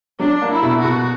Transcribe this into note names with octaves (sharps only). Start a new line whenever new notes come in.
F#3 D4
A#3
E4
B2
F#4
B2